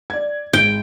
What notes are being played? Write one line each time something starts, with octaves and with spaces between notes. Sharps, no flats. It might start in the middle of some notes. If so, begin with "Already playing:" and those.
D5 G#6
G#1 G5